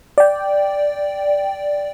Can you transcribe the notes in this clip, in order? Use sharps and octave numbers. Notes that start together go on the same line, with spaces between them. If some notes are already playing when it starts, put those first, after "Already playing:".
D5 G5